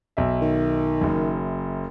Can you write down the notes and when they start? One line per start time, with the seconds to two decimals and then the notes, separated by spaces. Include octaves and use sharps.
0.17 B1 E5
0.42 D#3
1.01 F#1 F#2